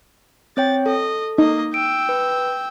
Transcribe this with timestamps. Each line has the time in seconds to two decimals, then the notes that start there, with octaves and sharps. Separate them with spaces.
0.57 C4 C#5 G5 A6
0.86 A4 D#5
1.38 A#3 D#4 D#5
1.74 G5 E6 D7
2.09 B4